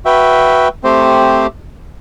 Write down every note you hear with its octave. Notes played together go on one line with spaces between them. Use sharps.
F#4 B4 E5 G5
A3 C4 G4 C5